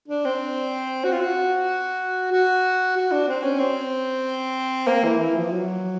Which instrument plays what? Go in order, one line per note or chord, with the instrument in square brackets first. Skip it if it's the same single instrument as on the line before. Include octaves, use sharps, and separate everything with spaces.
[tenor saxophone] D4
C4
F#4
F4
F#4
F#4
F#4
D4
C4
C#4
C4
A#3
E3
E3
F3
F#3